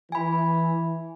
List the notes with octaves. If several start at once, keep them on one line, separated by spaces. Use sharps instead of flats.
E3 G#5 B5